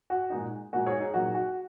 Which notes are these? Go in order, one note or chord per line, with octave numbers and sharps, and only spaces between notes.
F#4
A#2 G#3 D#4
A#2 G#3 D#4 F#4
G#4 C#5
D#4 G#4
A#2 F#3 D#4 F#4
F#4